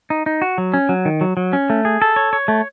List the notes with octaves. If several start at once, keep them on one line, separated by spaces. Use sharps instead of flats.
D#4
D#4
F#4
F#3
C#4
F#3
D#3
F#3
F#3
C#4
A3
G#4
A4
C#5
C#5
A3